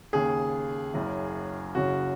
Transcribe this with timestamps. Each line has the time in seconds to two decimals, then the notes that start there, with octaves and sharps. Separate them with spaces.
0.13 D#2 C#3 G#4
0.94 F#1 F#2 C#3
1.75 F#1 F#2 C#3 F#4